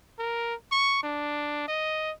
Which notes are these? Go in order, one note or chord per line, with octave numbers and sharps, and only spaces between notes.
A#4
C#6
D4
D#5